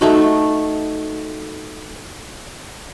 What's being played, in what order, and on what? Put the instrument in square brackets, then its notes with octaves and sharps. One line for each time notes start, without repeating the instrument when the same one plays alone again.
[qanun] A3 D#4 F#4